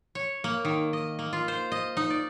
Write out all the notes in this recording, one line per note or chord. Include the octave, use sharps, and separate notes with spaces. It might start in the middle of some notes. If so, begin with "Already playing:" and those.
C#5
A#3
D#3
D#5
A#3
F4
C5
D#5
D#4
D5